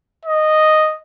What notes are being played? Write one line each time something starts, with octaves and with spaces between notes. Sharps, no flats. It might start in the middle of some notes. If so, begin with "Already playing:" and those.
D#5